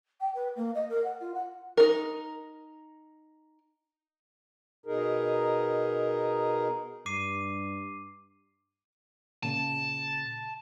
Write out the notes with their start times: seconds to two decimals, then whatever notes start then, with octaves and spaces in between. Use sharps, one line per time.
0.20 G5
0.35 B4
0.56 A#3
0.74 D#5
0.89 A#4
1.04 F#5
1.20 F4
1.34 F#5
1.77 D#4 A#4
4.86 B2 D#4 G#4 A#4
7.06 G2 D6 C7 D#7
9.43 A#2 C#3 A5